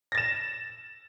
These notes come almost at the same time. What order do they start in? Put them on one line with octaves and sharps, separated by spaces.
A#6 A6 E7